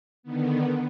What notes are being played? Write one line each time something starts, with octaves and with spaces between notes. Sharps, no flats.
D3 D#3 B3